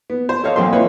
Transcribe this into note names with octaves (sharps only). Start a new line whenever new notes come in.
B3
C5
A4 C#5 D#5 F5
B1 A#3 C4 A4 C6
E4 F4 B4 C#5 D#5